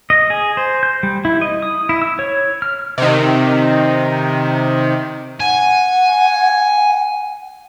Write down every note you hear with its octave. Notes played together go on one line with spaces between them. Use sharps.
D#5
G#4
C5
G6
G3
E4
D#5
D#6
E4
E6
C#5
F6
C3 D#3
F#5 G#5